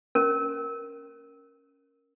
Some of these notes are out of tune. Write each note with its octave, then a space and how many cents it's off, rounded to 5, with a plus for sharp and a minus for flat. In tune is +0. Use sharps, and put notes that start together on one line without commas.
C#4 +0 A#4 +0